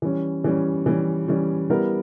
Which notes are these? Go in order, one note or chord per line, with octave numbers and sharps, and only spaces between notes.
E3 G3 C#4
E3 G3 C#4
E3 G3 C#4
E3 G3 C#4
G3 B3 E4 A#4